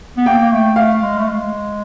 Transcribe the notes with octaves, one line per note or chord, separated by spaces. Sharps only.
B3
A#3 G5
A#3
A3
A3 F5
G#3
A3
G#3